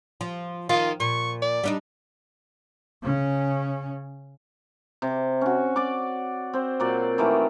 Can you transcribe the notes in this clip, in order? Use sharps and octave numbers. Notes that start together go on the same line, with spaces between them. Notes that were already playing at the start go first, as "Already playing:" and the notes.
F3
D#3 F4
A#2 C#6
D5
G3 D4 D#4
C#3 C#4
C3
C#4 F#4
D5 D6
C4 C5
A#2 F#3 D5
D#3 E3 A3